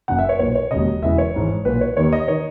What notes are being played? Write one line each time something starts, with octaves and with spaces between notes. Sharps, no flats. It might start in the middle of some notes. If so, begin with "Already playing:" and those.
F#1 F#2 C#3 F#5
E5
C#5
B1 A#2 C#5
C#5
E1 D#2 C#3 D#5
E1 E2 C#3 E3 E5
C#5
G#1 G#2 E3
B1 A#2 B4
C#5
D#2 D#3 C#5
D#5
D#3 C#5